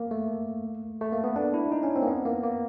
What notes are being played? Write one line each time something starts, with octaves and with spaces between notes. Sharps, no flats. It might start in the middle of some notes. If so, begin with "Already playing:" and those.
Already playing: A#3
A3
A3
A#3
B3
D4
E4
D#4
C#4
C4
A#3
B3
A#3
A#3